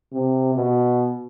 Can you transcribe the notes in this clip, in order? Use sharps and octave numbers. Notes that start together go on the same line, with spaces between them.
C3
B2